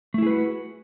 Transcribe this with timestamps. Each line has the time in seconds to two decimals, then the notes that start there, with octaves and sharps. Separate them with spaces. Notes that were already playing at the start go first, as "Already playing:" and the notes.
0.14 A3
0.18 E4
0.22 G#4
0.26 B4
0.31 F#4